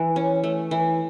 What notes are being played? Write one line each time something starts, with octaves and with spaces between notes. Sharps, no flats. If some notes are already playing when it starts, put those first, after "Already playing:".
Already playing: E3
C#4
A3
E3